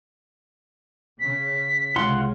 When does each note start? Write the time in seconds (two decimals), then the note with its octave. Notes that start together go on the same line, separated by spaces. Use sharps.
1.19 C#3 B6
1.96 C2 C#3 G#3 F4 F#5 C6